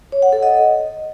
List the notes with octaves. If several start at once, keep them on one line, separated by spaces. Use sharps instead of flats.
C#5
F#5
A4
D#5